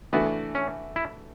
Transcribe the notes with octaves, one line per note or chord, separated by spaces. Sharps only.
E3 A3 B3 D4 F#4
C#4
E4